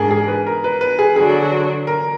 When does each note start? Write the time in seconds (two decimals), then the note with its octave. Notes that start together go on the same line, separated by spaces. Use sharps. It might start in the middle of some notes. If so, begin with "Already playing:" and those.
Already playing: G#2 D4 G#4 A#4
0.11 G#4
0.28 B4
0.47 A#4
0.64 B4
0.81 B4
0.99 G#4
1.16 D3 F#3 D4 F#4 G#4
1.87 A#4